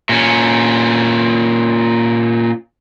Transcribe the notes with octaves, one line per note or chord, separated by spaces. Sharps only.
A#2 C#4